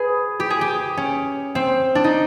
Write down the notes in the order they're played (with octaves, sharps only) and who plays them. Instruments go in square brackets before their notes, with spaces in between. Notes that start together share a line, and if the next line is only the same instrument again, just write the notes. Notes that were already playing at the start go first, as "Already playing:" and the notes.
Already playing: [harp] G#4 B4
G4
G#4
G4
C#4
C4
D4
D#4